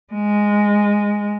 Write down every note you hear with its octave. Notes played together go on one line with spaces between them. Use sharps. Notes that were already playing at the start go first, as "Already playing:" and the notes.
G#3